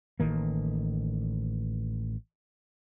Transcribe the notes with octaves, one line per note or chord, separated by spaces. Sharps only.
A1 D#3 A#3